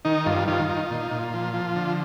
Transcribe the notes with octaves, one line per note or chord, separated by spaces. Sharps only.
D#3 D#4
G2 F4
D#3 F4
D#4
A#2
A#2
F3
F3
D3